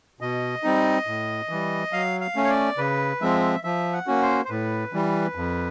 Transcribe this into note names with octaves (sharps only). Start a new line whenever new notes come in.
B2 D#5
G3 C4 D#4
A2
E3 G3
F#3 F5
F5
A3 C#4
C#5
D5
C#3 B4
F3 G#3 C4 E5
F3 E5
F#5
A#3 C#4 F#4
C5
C5
A2 B4
E3 G3
F2